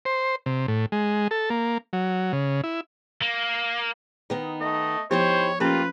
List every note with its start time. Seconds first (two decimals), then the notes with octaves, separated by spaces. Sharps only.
0.05 C5
0.46 C3
0.68 A2
0.92 G#3
1.31 A4
1.50 A#3
1.93 F#3
2.33 C#3
2.64 E4
3.22 A#3
4.30 D#3 B3 D#4
4.61 A3 D#5
5.11 F3 B3 D#4 E4 G4 C5 C#5
5.60 F3 A#3 C#4 F4 G4 A4 B4